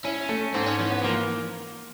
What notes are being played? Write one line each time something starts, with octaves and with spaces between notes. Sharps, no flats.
C#4 E4
A3
G#2 C4
C#4
E3 C#4
B3
F3 A#3